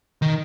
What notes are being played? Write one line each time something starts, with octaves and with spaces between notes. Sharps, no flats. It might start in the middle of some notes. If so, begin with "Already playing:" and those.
D#3